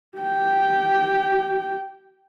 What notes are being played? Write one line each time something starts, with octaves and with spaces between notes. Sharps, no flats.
G4 G5